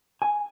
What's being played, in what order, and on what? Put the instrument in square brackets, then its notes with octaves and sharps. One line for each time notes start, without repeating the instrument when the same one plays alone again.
[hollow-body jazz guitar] G#5